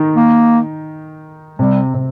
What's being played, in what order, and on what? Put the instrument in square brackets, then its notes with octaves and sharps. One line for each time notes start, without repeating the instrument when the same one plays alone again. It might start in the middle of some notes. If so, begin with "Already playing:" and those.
Already playing: [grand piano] D#3 D#4
[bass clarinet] A#3
[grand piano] C3 C4 [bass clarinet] G3
[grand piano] C3 C4